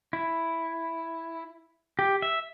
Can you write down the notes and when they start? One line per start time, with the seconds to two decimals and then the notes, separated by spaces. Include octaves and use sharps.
0.13 E4
1.99 G4
2.22 E5